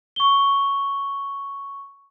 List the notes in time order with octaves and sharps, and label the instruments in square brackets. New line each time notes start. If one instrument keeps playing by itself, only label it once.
[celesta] C#6 G7